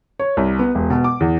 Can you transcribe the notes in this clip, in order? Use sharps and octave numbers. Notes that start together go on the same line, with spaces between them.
C#5
C2
B3
E1
B2
D6
E2